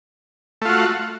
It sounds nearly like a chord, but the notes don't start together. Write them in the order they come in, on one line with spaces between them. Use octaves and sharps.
A3 F4 F#4